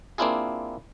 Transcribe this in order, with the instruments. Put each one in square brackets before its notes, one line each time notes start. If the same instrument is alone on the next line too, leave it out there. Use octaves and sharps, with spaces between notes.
[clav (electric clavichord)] A#3 C4 D4 E4 F4 G#4